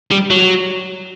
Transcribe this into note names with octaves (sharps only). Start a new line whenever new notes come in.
G3
F#3